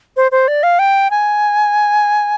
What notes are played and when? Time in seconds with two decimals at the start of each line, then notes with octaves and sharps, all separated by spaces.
0.17 C5
0.32 C5
0.48 D5
0.63 F5
0.79 G5
1.11 G#5